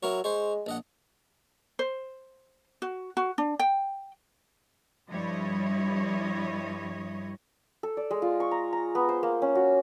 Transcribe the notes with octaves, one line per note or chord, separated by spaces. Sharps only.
F#3 E4 A#4 C#5
G#3 C5 C#5
A#1 D#5 F#5
C5
F#4
F#4
D4
G5
G2 F3 G3 E4 C#5 D#5
A4
D5
G#3
F4
C#6
A#5
A#5
B3
C5
A#3
C#4
F#4